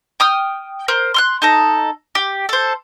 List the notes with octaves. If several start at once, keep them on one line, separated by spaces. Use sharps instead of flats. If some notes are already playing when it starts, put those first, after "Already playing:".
G5 D#6 F6
A#4 C5
C6 F6 F#6
D#4 A4 A#5
G4
A4 C5